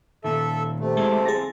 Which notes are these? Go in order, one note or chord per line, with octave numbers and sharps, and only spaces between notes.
A#2 D#3 A4 E5
C3 A3
G#3 C4 E4 A4
G#4 A6 A#6